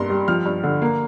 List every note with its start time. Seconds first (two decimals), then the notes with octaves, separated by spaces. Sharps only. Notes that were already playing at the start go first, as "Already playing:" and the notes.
Already playing: G2 A#3 A#5 C6
0.10 G3
0.28 F3 F6
0.45 G2
0.63 D3
0.82 A#3